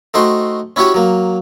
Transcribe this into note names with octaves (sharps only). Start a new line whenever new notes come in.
A3 D#4 F#4 C5 G5
C#4 E4 F#4 G4 C#5
F#3 A#3